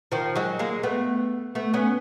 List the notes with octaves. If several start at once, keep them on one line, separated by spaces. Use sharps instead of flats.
D#3 F3
F#3 G#3
G#3 A#3
A3 B3
A3 B3
B3 C#4